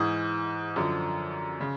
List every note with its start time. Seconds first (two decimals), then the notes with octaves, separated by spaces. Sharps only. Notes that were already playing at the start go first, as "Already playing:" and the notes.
Already playing: G#2 E3 D#6
0.76 F#2 D3 F3
1.61 C#3